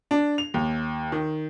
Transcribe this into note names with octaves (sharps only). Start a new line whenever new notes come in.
D4
F7
D#2
D#3